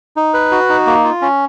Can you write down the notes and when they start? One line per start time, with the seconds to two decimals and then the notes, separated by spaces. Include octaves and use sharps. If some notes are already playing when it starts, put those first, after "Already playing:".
0.16 D#4
0.34 B4
0.52 F#4
0.69 D#4
0.87 A#3
1.04 F4
1.22 C#4